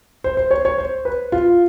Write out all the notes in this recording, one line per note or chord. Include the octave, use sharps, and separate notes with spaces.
C5
C5
C#5
C#5
C5
B4
F4